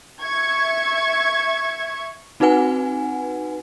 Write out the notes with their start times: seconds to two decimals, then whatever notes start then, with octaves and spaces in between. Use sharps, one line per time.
0.22 E5 C#6 G#6
2.40 C4 D#4 F#4 B4 F#5 G#5